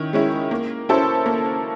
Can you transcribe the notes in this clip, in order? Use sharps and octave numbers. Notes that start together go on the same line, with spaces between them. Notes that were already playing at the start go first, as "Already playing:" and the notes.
Already playing: D#3 C#4 E4
G#3 C#4 E4
A#3
C#4 E4 A4 C5
A#3